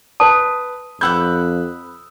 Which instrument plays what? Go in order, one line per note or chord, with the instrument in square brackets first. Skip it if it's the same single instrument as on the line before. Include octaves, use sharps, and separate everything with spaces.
[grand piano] B4 D#6 [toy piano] A5
[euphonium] F2 [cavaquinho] B4 F#5 D6 [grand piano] E6 G6